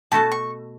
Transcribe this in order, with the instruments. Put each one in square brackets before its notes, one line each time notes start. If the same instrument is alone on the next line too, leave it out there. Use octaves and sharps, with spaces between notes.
[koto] B2 A3 F#4 A4 [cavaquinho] A5
[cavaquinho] C#6